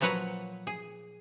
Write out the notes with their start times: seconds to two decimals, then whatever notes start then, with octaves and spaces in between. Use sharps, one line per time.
0.01 A#2 F3 F#3 B4 C#5 A#5
0.67 G#4